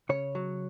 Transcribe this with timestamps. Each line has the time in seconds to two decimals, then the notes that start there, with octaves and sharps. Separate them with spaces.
0.09 C#3 C#5
0.35 F#3